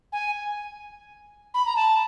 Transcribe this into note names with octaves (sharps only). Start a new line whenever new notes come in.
G#5
B5
A#5
A5